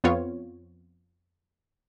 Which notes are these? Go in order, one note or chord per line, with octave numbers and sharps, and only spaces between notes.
F2 B3 C4 F4 C#5